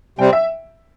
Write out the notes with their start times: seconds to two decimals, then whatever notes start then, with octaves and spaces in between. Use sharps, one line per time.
0.19 C3 G3 C4 G5
0.33 E5